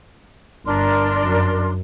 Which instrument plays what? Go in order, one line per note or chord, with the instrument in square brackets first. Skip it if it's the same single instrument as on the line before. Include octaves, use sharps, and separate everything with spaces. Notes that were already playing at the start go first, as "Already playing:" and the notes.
[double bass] G1 [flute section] D4 A#4 C6
[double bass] F#2